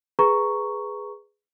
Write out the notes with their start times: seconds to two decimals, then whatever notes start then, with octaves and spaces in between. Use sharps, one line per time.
0.19 G#4 B4 A#5 C#6